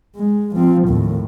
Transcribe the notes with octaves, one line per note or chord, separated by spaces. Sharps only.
G#3
F3 C4
D#2 A2